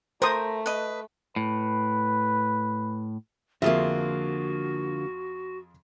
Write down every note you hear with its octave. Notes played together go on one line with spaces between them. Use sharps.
A3 A#4 C5 A#5 D#6
B4 D#5
A2 B4
F2 D3 F3 A#3 F4 F#4 G#4 E5